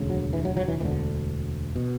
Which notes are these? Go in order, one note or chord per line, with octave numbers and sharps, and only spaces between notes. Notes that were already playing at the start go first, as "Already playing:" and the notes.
Already playing: E1 D2 C#3
F#3
E3
F#3
F#3
E3
E1 D2 D3 E3
B2